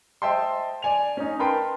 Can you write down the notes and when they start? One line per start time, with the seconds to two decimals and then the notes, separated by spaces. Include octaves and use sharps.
0.22 C5 D#5 E5 G5 A5 C6
0.82 D5 G#5 F7
1.17 C#4 D#4
1.39 A#4 B4 G5 A5 C6